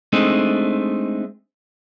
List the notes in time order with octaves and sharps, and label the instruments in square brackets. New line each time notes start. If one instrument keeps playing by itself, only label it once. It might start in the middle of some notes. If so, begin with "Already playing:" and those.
[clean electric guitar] G#3 A3 C4 D4 D#4